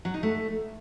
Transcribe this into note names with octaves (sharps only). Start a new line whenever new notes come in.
F#3
D#4
A3